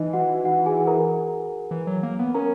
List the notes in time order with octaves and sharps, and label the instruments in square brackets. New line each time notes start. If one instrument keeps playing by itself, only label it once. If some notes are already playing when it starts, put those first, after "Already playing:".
Already playing: [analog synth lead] E3 [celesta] D#4 D#5
[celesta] F#4 F#5
F#4 F#5
G#4 G#5
A#4 A#5
[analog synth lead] E3
F#3
A#3
B3
[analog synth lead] C#4 [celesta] A#4 A#5